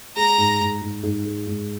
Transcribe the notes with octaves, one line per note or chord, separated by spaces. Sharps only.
G#3 A#5
G#2
G#2
G#2
G#2
G#3
G#2